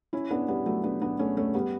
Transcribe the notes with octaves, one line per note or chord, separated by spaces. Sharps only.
C#4 E4
B3 D4
G3 B3
F#3 A3
B3 D4
B3 D4
A3 C#4
A3 C#4
G3 B3